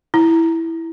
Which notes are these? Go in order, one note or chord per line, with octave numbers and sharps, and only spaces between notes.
E4